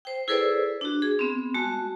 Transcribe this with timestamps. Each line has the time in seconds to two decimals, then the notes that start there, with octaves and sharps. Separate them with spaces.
0.05 C5 G5
0.28 E4 G#4 A4 B4 C5 D5
0.81 D4 F#4
1.02 G#4
1.19 B3 C4
1.54 G#3 F#4 A5